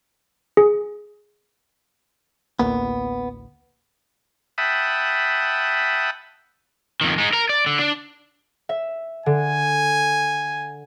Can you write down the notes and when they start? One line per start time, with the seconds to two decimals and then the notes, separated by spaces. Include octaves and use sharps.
0.57 G#4
2.59 A1 D2 A#3 B3
4.58 E5 F#5 G5 A5 B5 D#6
7.01 F2 D#3
7.18 G#3 D#4
7.33 A#4 A#5
7.49 D5
7.66 D3
7.79 D4
8.69 E5
9.26 D3 G#5